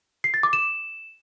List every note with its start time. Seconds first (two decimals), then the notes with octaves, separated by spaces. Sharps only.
0.24 C7
0.34 A6
0.43 D6
0.53 E7